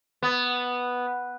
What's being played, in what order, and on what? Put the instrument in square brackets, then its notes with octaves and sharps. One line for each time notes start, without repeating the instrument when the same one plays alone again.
[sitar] B3